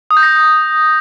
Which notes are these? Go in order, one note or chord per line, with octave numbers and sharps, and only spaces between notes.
D#6
G6
A#6